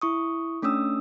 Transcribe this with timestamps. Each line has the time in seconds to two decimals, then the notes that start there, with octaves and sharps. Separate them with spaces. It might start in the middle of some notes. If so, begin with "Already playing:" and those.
0.02 E4 C#6 D#6
0.62 A3 C#4 D4 D#6 E6